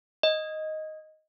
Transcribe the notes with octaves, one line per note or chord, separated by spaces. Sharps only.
D#5